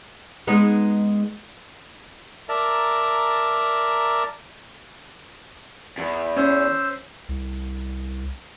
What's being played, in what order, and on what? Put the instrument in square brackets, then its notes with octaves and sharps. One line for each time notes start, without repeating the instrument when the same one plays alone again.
[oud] G#3 B3 D#4
[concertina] A#4 D5 E5 A5 A#5
[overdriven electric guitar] E2
[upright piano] C#4 [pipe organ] C5 E6
[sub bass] C2